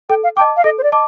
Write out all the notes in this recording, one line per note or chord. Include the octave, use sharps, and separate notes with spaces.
A4 G5
F5
D#5 G5 A5 D6
F5
A4 D#5
C5
D5
D#5 A5 D6